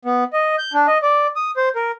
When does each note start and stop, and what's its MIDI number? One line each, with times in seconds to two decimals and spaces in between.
0.05 0.24 59
0.33 0.56 75
0.58 0.73 91
0.74 0.87 62
0.87 0.98 75
1.03 1.27 74
1.36 1.51 87
1.57 1.69 72
1.76 1.91 70